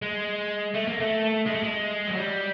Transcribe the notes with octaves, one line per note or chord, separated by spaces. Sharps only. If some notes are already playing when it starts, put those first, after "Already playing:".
G#3
A3
A#3
A3
G#3
A3
G#3
F#3
G3